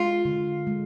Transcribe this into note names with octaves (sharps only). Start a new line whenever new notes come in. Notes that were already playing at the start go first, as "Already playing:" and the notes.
Already playing: G#3 F4
D3
G#3